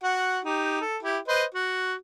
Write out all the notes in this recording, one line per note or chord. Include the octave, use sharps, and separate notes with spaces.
F#4 F#5
D#4 G4
A4
E4 G4
B4 C5 D#5
F#4